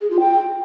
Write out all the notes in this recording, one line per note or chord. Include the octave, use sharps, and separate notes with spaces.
G#4
F4
G5